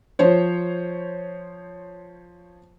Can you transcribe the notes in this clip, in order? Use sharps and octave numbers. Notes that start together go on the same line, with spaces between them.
F3 C5 C#5